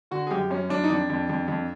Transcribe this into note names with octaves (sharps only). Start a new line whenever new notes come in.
D3 F#4
G#4
F#2 G4
F#2 C#4
F#2 D4
D#4
F2 D4
F2
F2
F2